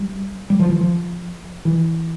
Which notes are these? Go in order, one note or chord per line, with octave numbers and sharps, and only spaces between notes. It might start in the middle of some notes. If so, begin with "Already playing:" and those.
Already playing: G3
G3
F3
E3
F3
E3